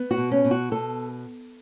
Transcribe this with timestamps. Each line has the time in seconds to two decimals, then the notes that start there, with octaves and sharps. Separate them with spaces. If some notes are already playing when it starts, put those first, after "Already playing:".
Already playing: B3
0.11 F#4
0.17 B2
0.31 C#4
0.44 B2
0.51 F#4
0.71 B2 A4